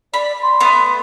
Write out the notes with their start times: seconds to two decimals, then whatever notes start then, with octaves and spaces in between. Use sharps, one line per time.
0.14 D5 B5
0.43 C6
0.60 A3 B3